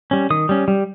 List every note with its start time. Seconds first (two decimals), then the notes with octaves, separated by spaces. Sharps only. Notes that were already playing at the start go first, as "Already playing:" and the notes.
0.11 G3 C#4
0.30 D#3 D#6
0.49 G3 C#4
0.68 G3